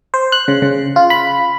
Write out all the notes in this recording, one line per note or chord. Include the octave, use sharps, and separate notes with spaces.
C5
F#6
C#3
C#3
F4
B5